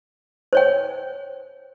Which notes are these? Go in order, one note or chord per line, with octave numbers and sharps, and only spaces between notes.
C5 C#5 G5